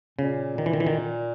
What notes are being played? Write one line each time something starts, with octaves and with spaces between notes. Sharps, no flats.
A#2 C#3
D#3
E3
D#3
E3
D#3